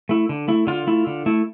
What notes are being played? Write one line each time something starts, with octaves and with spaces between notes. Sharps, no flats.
A3 E4
D3
A3 E4
D3 F4
A3 E4
D3
A3 E4